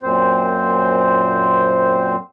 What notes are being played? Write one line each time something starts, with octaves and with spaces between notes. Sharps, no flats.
F#2 A#2 C4 C5